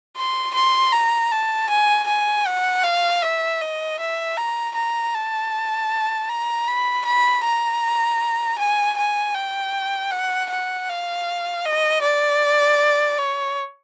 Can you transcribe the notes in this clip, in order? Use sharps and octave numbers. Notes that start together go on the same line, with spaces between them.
C6
C6
A#5
A5
G#5
G#5
F#5
F5
E5
D#5
E5
A#5
A#5
A5
A#5
B5
B5
A#5
G#5
G#5
G5
F#5
F#5
F5
D#5
D5
C#5